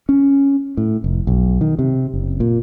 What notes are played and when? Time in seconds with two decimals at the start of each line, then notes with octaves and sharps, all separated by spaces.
0.09 C#4
0.77 A2
1.04 F1
1.27 B1
1.61 D#3
1.79 C3
2.14 F#1
2.40 A#2